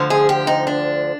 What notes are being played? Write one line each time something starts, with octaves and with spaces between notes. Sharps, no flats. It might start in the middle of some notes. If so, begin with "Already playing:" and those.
Already playing: D2 D3 F3
G#4
G4
D#4
D4